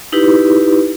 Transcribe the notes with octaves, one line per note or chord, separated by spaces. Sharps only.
D#4 E4 G4 B4